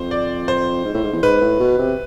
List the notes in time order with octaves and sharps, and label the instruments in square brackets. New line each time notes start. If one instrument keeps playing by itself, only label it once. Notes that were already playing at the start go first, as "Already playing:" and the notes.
Already playing: [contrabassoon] F2 [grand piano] C5
[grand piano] D5
C5
[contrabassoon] G#2
A2
G#2
E2
[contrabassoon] G#2 [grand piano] B4
[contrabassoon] A2
B2
C3